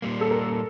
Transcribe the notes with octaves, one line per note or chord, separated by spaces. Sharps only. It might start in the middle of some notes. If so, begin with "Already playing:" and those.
A#2 G3 A#3
A4
A#4